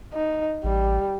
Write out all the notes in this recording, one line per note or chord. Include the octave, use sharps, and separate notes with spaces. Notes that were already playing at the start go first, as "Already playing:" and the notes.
D#4
A1 G3